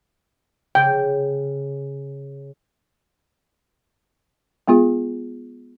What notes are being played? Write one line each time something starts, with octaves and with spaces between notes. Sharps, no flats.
C#3 G5
G#3 B3 F4 G#4